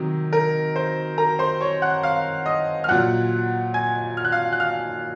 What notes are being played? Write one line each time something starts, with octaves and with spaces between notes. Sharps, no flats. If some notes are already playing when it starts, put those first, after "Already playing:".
Already playing: C3 D#3 F#3
A#4
C5
A#4 A#5
C5 C6
C#5 C#6
F#5 F#6
F5 F6
D#5 D#6
F6
A#2 F#3 F#5 F#6
G#5 G#6
F6
F#6
F5 F6
F#6
F5 F6